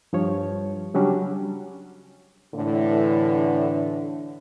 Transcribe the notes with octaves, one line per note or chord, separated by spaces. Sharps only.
G2 F3 C#5
C#3 F#3 G3 C#4 D4
A2 D3 E3